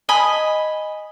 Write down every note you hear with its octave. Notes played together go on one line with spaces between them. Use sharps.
D#5 G#5 B5